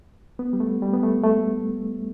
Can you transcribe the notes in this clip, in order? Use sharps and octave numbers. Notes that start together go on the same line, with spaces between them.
B3
G3
A3
G3
B3
A3
A3